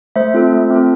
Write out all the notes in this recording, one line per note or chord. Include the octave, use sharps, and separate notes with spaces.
A3 C5 E5
C4 F4 A4
A3
C4 F4 A4